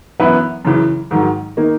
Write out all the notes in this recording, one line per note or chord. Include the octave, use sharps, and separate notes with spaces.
F#2 E3 B3 E4 B4
F#2 C#3 E3
G#2 D#3 F#3
D#3 A#3 D#4